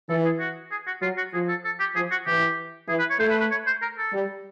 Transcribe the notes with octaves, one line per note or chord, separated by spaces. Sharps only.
E3 A4
G#4
F#4
G#4
F#4
F#3 F4
F#4
F3 G#4
A4
A4
G4
F3 G#4
F#4
E3 G4
E3 G#4
B4
C#5
A3 C5
B4
B4
C#5
C5
A#4
A4
G3